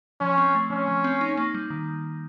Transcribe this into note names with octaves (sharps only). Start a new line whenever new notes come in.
F3 C#4
C4
A3
F3 C#4
F3
C4
D#4
A#3
G3
D#3